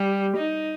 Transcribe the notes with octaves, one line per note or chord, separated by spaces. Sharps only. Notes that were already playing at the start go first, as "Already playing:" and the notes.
Already playing: G3
D#4